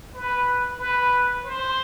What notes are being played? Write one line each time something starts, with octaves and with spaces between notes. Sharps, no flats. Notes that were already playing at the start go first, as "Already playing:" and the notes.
B4
B4
C5